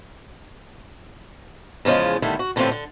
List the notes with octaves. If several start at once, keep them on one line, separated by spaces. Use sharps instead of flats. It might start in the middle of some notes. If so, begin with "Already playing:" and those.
E2 C#3 F3 G#3
D3 D#3 G3 A3 E4
F#4
A2 D3 E3 C4 F4 G4
D3